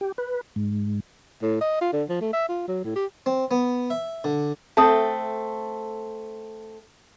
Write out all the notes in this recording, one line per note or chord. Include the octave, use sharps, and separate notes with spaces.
G4
B4
G#2
A2
D#5
F4
D3
F3
A3
E5
F4
F#3
A2
G4
C4
B3
E5
D3
A3 C4 A4 A5 D#6